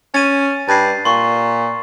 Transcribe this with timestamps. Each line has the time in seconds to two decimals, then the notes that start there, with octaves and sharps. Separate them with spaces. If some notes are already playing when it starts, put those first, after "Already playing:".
0.14 C#4 A6 D#7
0.69 G2 A6 C7
1.05 A#2 C6 C#6